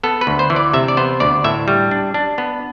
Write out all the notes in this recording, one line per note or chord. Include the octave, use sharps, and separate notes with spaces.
B3 A4
B4
D2
C5
E3
D5
C3 E5
D5
B3 C5
D2 D5
A2 E5
G3
D4
D4
B3